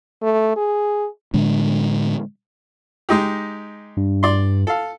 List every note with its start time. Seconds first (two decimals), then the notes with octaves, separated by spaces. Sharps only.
0.22 A3
0.56 G#4
1.34 A2 D3 G#3 D4
3.09 G#3 D#4 G4
3.97 G2
4.23 D5 C6
4.67 A4 F5